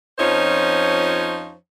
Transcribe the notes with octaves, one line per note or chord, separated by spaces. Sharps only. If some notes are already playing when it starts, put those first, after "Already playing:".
F2 F3 C#4 D#4 C5 C#5